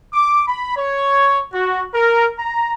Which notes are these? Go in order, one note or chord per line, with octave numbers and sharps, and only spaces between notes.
D6
B5
C#5
F#4
A#4
A#5